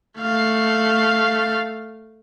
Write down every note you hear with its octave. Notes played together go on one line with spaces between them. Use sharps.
A3 F5